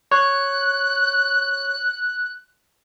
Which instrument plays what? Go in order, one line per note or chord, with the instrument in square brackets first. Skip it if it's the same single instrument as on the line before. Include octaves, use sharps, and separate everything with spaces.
[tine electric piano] C#5 [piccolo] F#6